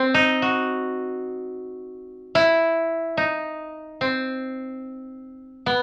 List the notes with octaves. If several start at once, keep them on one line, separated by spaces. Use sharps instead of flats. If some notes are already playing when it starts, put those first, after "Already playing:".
Already playing: C4
D#4
F#4
E4
D#4
C4
B3